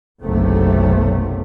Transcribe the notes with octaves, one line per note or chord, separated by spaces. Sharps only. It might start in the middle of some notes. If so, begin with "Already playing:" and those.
F#1 B1 C3 A3